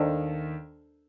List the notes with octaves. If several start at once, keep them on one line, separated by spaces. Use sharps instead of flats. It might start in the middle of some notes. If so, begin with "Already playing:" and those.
Already playing: D#2 D#3 D4 A4 C5 D#5